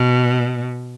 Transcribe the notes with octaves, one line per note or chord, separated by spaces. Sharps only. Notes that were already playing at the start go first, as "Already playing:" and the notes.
Already playing: B2